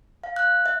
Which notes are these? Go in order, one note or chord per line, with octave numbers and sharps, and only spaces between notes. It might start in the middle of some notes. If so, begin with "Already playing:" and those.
F5
F#6
E5